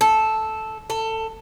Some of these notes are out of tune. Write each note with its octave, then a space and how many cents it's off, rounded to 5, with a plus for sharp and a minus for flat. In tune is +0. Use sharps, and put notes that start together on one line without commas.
A4 -5
A4 +20